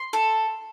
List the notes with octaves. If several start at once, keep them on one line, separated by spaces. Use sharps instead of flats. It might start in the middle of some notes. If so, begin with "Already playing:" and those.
Already playing: C6
A4